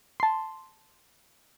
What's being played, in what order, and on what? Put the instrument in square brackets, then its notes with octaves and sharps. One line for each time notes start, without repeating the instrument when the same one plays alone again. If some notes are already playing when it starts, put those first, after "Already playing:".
[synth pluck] A5 C6